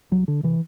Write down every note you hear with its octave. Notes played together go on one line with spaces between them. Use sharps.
C2 F#3
D3
C3 E3